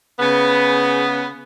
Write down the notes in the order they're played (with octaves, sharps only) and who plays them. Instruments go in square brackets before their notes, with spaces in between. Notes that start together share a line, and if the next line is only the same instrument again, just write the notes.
[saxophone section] C#3 B3